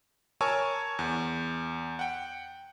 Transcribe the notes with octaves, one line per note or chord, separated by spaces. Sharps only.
A#4 C#5 G#5 A5 C#6 E6
E2
F#5 G5